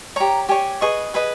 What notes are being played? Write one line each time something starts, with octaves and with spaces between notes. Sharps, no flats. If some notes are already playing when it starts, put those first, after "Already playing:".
G4 C#5 A#5
G4 C#5 G#5
G#4 B4 D#5 C#6
G#4 B4 D#5